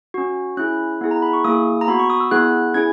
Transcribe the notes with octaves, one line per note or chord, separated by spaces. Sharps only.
C#4 F#4
C#4 E4 G#4 F#6
B3 E4 G#4
A#5
B5
C#6
A#3 E4 G#4 D#6
A#5
B3 F#4 B5
C#6
D#6
E6
B3 E4 G#4 F#6
C#4 E4 G#4 G#6